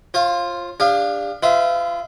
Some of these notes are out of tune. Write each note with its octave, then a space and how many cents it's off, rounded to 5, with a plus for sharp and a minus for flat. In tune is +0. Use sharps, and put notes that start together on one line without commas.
F4 +0 C5 +45
D4 +0 G4 +45 F5 +0
F4 -25 B4 +45 E5 -20